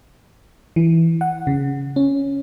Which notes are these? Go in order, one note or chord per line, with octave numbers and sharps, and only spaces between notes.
E3
F#5
C#3
C#4